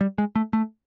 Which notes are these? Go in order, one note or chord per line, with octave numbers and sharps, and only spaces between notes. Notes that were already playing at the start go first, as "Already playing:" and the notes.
G3
G#3
A3
A3